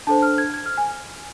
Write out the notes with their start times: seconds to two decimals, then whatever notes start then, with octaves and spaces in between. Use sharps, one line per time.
0.07 D4 A4 C5 A5
0.22 F6
0.38 G#6
0.54 G#6
0.66 F6
0.78 G#5